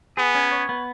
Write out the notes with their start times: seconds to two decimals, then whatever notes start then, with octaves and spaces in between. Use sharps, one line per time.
0.17 B3 G#4
0.35 C#4
0.52 C#5
0.69 B3